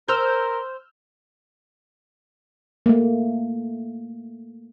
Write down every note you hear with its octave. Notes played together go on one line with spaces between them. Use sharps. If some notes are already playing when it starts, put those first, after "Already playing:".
A#4 C5 E6 F6 G6
A3 A#3